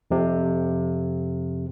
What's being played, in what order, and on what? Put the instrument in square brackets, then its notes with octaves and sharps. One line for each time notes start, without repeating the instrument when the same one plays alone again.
[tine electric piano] F2 C3